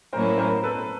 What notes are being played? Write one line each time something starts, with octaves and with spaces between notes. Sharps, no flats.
A2 F#3 A#3 C#4 E4 A#4 C5
A#4 C5
A4 B4